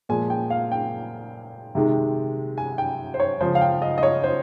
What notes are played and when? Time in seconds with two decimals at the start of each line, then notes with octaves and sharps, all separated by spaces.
0.09 A#2 F3 G#3 G#5
0.30 G5
0.50 F5
0.72 G5
1.75 C3 D#3 G#3
2.58 G#5
2.78 G5
3.14 C5
3.20 C#5
3.40 C#3 F3 G#3 C5
3.55 F5
3.61 G5
3.82 D#5
3.98 D#5
4.03 C#5
4.24 C5